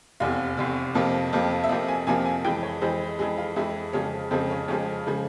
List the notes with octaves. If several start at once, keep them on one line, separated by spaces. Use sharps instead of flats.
F1 E2 C3 F5
F1 E2 C3
F2 C3 F3 A#3
F2 C3 F3 A#3
E5
F2 C3 F3 A#3 F5
G#5
F2 C3 F3 A#3 G#5
G#5
F2 E3 G#3 G5
C#5
F2 E3 G#3 C5
F2 E3 G#3 G#4
F4
F2 E3 G#3 E4
F2 C#3 F3 G#3 C#4
F2 C#3 F3 G#3 C4
C#4
F2 C#3 F3 G#3 C#4
C#3 F3 G#3